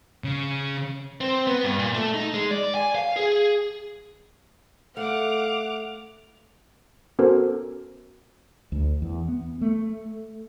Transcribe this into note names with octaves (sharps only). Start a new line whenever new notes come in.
C#3
C4
B3
G2
A#2
A3
D#4
G#3
D5
G#5
F5
G#4
A3 F5 F#5 D6 F7
B3 C#4 F#4 A4 A#4 C5
D2
E2
B3
A3